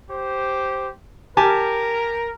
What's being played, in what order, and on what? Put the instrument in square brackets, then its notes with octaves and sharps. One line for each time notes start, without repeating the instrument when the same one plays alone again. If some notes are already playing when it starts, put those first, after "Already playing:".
[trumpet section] G4 C5
[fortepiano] G4 G#5 A5 [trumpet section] A#4